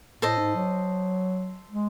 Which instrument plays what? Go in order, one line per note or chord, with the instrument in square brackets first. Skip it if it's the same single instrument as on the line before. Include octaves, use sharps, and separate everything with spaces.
[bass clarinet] A2 [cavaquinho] A4 C5 D#5
[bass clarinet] G#2
F#3
G#3